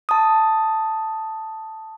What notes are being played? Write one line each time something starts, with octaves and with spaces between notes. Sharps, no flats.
A5 D#6